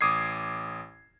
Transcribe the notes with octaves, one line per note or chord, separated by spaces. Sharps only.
A1 D6 D#6 G#6 C7